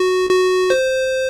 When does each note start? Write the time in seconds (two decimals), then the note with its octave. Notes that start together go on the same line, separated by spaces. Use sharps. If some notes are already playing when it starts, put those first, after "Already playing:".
Already playing: F#4
0.30 F#4
0.70 C5